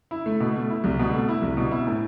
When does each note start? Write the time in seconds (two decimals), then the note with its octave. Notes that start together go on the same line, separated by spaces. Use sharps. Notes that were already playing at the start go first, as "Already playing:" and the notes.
0.11 E4
0.26 A3
0.40 B2
0.55 A3
0.70 E4
0.84 C2
0.99 B2
1.13 A3
1.29 E4
1.42 C2
1.57 B2
1.71 E4
1.87 A2